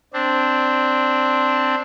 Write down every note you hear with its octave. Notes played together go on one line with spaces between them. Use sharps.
C4 D4